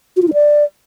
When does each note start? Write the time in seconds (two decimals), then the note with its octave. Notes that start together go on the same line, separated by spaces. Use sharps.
0.17 F#4
0.22 F4
0.28 D#4
0.33 D5